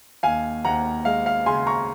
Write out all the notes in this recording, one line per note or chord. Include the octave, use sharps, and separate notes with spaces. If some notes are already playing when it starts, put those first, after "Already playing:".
D#2 F5 G#5
D#2 F#5 A#5
G#3 F5
F5
C#3 G#5 C6
A#5 C#6